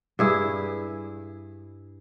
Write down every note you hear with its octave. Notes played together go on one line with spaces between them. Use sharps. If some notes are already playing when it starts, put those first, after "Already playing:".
G2 E4 G#4